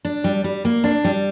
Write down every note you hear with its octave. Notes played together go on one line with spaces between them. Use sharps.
D4
G3
G3
A#3
D4
G3